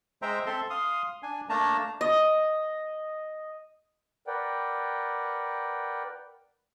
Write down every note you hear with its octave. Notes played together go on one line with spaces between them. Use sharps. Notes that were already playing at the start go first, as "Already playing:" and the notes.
G#3 C5 E5 G5 A#5
C4 A4 E5 C6
F5 C6 D#6
D4 G#5
A3 A#3 D4 A5 A#5
D#5
A#4 B4 D5 F#5 G5